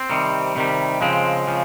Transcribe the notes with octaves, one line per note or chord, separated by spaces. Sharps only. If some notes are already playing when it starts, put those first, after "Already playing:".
Already playing: C4
C3 D#3 G3
C3 D#3 G3
C#3 F3 G#3 C4
C#3 F3